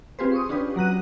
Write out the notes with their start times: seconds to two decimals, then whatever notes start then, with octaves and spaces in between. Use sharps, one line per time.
0.19 C4 F4 G4 G#4 B4 C5
0.32 C6 C#6 D#6
0.49 C#4 D4 F4 G4 B4
0.76 F#3 A#5 F#6 D#7